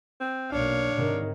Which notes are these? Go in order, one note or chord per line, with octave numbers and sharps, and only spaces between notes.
C4
B1 A#3 D4 C#5 F5
G#2 C3 D#3